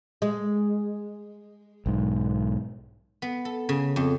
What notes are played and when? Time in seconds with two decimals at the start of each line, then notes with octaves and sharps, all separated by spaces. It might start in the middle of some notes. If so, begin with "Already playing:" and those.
0.22 G#3
1.86 B1 G#2
3.22 B3
3.45 A4
3.69 C#3
3.96 F2